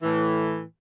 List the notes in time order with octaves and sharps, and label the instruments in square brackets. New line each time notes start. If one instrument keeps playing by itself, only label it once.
[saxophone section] A2 E3